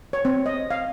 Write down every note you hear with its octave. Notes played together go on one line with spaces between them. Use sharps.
C#5
C4
D#5
F5